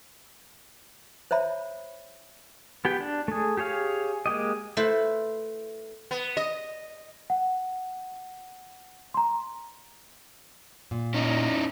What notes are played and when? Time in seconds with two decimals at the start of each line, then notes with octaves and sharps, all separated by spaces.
1.31 C5 C#5 E5 B5
2.85 B3 G4 G5
3.00 D4
3.28 A3 G#4
3.57 G4 G#4 C#5 F5
4.26 G#3 A#3 G4 D#5
4.77 A3 E4 B4 C5
6.11 B3
6.37 D#5
7.30 F#5
9.14 A#5 C6
10.91 A#2
11.14 C#4 D#4 E4